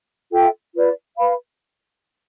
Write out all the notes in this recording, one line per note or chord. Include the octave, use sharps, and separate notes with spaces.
F4 A4 E5 G5
F4 B4 D5
B4 F5 B5